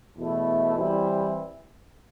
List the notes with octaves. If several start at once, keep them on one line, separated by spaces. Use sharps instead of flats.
E2 B2 A3 E4
E3 G3 C4 E4